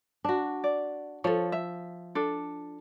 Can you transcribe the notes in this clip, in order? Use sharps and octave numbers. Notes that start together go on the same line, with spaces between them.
D4 F#4
D5
F3 A4 C#5
E5
D4 A4